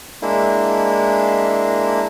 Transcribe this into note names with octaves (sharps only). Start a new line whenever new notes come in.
G#3 A#3 D4 E4